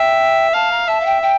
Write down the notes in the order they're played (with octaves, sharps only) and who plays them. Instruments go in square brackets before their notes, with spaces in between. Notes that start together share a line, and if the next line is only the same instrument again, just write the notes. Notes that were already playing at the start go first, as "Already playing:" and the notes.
Already playing: [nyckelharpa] E5 [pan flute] G5
[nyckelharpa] F5 [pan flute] A5
[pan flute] A#5
[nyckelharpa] E5 [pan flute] A5
[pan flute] F5
G5
G5